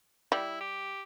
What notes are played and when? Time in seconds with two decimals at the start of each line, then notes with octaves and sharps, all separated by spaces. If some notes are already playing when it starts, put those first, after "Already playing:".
0.32 G3 E4
0.60 G4